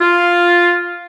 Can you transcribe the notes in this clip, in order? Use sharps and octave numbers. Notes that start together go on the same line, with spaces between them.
F4